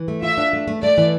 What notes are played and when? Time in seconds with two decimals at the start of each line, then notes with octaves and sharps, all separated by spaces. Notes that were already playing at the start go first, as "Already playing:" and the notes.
Already playing: E3
0.08 A3
0.22 F4 E5
0.38 D4
0.53 A3
0.68 A3
0.82 A3 D5
0.98 E3